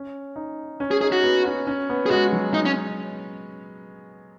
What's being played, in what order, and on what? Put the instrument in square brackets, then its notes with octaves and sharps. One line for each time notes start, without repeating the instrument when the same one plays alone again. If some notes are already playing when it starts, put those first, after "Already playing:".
Already playing: [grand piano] C#4
D#4
C#4
[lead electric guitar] G#4
[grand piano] D#4 [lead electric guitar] G#4
[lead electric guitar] F#4
[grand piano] B3
C#4
C#4
B3
[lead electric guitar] G#4
[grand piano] G#3 [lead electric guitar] F#4
[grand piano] F#3
[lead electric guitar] D#4
C#4